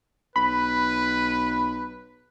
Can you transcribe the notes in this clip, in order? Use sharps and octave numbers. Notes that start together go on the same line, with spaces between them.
B1 B4 B5